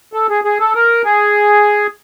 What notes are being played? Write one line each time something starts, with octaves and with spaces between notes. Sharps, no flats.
A4
G#4
G#4
A4
A#4
G#4